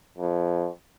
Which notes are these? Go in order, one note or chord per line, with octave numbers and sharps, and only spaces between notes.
F2